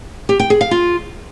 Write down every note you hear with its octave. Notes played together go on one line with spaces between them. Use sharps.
G4
G5
G#4
F5
F4